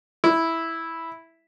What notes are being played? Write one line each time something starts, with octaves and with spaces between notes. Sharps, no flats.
E4